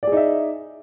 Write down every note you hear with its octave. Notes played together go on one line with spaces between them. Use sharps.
D#4 G#4 D5 E5